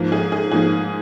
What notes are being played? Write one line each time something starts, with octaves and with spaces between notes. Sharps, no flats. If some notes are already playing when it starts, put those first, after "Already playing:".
Already playing: G#2 F3 A#3
G#4
G#4
G#2 F3 A#3 G#4